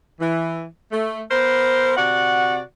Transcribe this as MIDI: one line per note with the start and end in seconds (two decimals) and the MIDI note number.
0.20 0.64 52
0.92 1.21 57
1.30 1.93 59
1.30 1.93 70
1.30 1.93 72
1.97 2.60 48
1.97 2.60 66
1.97 2.60 74
1.97 2.60 78